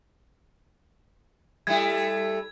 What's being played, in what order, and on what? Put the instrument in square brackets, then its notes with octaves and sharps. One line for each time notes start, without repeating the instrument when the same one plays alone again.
[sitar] G3 A3 E4 [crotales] G#6